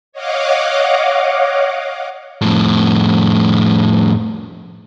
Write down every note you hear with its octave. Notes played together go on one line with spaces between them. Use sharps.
C#5 D#5 F5 F#5 D6
F2 A2